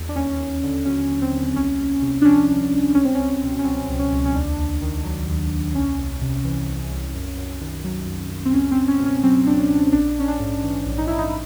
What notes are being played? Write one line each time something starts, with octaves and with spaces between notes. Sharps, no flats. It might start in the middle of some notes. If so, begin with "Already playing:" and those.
Already playing: E2
D4
D#2 C#4
D#2
D3
F#3 C#4
D#2
C4
D#2
C2 C#4
C2
C3
D4
F3 C#4
C2
C2
C#2 C#4
C4
C#2 C#4
B2
C#4
F#3 C4
C#2
C#4
C#2
C#4
D#2 D4
D#2
D#3
F#3
D#2
D#2
C2 C#4
C2
C3
E3
C2
C2
F#2
F#2
D#3
F#3
F#2
F#2
C4
C#2 C#4
C#2 C4
C#4
B2
C#4
F#3 C4
C#2 D4
C#4
C#2
A#1 D4
A#1 C#4
D4
G#2
E3
A#1
D#4
A#1 E4
D#4